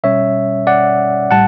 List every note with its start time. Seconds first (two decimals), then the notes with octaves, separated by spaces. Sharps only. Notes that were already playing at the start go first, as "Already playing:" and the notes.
0.04 B2 G3 C#4 C#5 E5
0.67 D5 F#5
1.31 A2 G3 F#5 A5